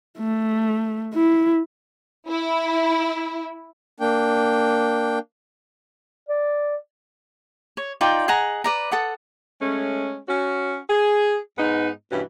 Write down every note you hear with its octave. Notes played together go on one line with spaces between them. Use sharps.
A3
E4
E4
A#3 D4 G5
D5
C#5
D#4 F4 D5 G5
G#4 D#5 F#5 A#5
B4 D5 A#5
A4 F#5 D#6
G#3 A3 C#4
C#4 F#4
G#4
G#2 B3 D#4
G2 B2 E3 C#4